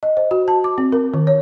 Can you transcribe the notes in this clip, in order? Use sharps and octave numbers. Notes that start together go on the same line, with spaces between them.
D#5
C5
F#4
A5
D6
C4
A#4
D#3
C#5